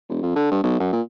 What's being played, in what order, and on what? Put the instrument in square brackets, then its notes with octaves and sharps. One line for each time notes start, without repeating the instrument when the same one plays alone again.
[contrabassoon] E1
F2
D3
G2
B1
F#2
A#2